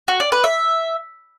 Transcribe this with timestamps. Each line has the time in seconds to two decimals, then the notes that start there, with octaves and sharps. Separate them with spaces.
0.08 F#4
0.20 D5
0.32 B4
0.44 E5